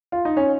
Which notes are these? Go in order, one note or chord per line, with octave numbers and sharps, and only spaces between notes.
F4
D#4
C#4